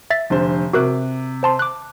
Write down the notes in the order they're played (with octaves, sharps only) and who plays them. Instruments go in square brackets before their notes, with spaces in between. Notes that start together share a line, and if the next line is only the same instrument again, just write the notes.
[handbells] E5 A6 B6
[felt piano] F1 D3 C5
[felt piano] C3 D6 [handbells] F#4 A#4 F#6
[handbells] C5 A5 C6
D6 F#6